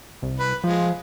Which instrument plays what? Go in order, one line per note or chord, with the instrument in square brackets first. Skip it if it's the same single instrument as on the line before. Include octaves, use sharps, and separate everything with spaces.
[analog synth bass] C2
[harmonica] B4
[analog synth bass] F3 [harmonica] G#3 F4